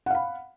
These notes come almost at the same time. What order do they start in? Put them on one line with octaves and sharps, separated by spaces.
F#5 F5 B5